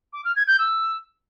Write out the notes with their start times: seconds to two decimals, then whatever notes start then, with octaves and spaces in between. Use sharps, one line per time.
0.13 D6
0.24 F6
0.35 G#6
0.47 G6
0.58 E6